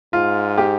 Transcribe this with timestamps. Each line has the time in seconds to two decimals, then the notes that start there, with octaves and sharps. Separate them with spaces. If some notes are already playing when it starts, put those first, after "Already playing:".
0.13 G#2 F4
0.58 G4